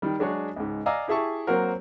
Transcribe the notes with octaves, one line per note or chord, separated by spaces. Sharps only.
D#3 G3
F#3 G#3 D4 F#4 G#4 C#5
C#2 G#2
D5 D#5 F5 G#5 A#5 E6
E4 G4 G#4 E5 A5 C#6
F#3 A#3 C4 F#4 A#4